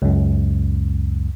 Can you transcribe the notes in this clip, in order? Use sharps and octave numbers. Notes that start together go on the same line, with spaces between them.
C#2 F#2